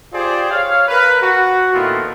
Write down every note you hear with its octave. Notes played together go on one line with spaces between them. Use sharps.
F4 G4 G#4 C5 D5
C#5 F5
A#4 B4
F#4
A#2 D#3 A3 B3 E4 F4